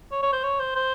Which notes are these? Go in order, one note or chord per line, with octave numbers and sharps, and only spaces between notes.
C#5
C#5
C5
C#5
C5
C5